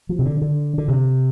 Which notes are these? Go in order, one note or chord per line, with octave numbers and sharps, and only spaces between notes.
F3
C3
D3
D3
D3
C3